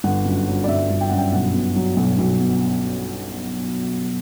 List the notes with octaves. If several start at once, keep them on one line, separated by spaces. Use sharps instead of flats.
G1 F#5
F#2
F#3
D5
G1 E5
G1
G5
F#2 F#5
G5
B1 F#5
B2
F#3
B1
B1
B2